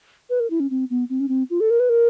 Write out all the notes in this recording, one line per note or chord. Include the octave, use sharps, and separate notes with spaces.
B4
A#4
E4
C#4
C4
B3
C4
C#4
C4
F4
A4
A#4
B4
A#4